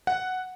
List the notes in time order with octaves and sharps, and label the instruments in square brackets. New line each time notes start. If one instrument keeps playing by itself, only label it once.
[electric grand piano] F#5